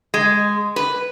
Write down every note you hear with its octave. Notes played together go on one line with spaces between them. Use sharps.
G#3
B4